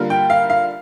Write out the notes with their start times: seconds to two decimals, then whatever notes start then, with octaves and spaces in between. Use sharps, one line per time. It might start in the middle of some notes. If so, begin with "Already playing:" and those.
Already playing: D3 G3 A#3 F4 A#4
0.10 G5
0.30 F5
0.50 F5